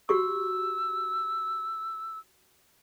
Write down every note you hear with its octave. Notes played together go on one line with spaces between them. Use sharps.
F#4 G4 C#6 E6